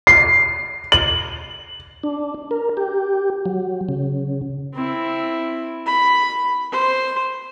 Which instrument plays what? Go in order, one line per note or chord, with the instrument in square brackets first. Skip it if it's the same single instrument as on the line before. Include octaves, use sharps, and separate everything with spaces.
[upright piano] C7
F#7
[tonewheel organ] D4
A#4
G4
F#3
C#3
[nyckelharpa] C4 E4
B5
C5